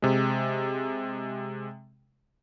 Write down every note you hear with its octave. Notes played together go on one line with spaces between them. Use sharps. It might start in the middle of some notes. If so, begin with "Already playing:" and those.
C3 G#3